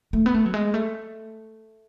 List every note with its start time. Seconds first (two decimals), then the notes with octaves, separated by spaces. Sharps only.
0.13 A3
0.26 B3
0.34 A3
0.46 F#3
0.54 G#3
0.74 A3